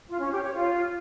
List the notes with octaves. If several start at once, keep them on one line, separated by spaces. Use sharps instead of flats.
F4
C#4
G4
C#5
F4